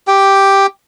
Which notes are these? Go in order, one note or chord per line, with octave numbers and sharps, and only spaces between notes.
G4 G5